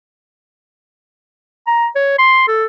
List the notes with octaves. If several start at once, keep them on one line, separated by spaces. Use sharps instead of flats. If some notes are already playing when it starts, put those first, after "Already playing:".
A#5
C#5
C6
A4